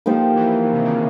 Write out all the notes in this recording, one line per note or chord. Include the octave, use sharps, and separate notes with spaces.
F3 A#3 D#4 G4 C5
E3
D#3
C3
C#3